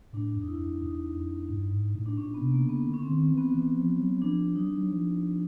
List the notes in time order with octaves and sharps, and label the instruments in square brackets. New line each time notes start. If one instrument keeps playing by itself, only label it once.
[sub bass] A2 [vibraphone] D4
[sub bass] F2
[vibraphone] D#4
E4
[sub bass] F2
[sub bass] E2 [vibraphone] D#4
[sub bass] F2
G2
G#2
A2
[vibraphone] D4
[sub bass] A#2 [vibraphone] C#4
[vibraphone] B3
[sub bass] C3
[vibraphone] A#3
[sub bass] C#3
[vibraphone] B3
[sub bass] D3
[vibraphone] C#4
C4
[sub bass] D#3
[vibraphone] C4
[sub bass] E3
[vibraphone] B3
[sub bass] E3 [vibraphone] C4
[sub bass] F3
F#3
[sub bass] F3 [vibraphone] D4
[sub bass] F#3 [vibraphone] D#4
[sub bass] F#3
F3